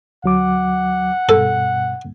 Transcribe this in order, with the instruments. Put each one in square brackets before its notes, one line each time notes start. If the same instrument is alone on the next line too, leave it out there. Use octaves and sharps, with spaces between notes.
[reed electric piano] D2 F#3 D6 [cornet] F#5
[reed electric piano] G2 B2 [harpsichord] A4